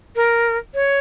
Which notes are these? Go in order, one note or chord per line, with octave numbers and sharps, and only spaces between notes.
A#4
C#5